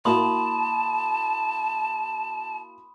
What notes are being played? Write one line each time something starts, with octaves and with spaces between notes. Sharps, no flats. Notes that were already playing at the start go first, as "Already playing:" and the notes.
A#3 E4 F#4 A5 B5 C6 D#6